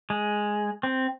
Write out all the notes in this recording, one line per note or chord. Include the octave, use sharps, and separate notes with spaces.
G#3
C4